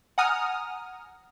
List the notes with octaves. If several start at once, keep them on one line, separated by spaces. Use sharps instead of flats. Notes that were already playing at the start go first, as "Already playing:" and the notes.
F#5 G#5 A#5 D#6 F6